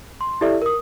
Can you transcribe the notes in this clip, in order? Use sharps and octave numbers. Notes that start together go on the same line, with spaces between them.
C6
E4 G4 A4 D5 E5
A#4 D#6